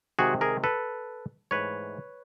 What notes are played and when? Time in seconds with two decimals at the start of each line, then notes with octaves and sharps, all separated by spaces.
0.19 C3 D#3 G#3 C4 F#4 G#4
0.41 G#4 A#4
0.64 A4 B4
1.51 G#2 E3 A3 B4 C#5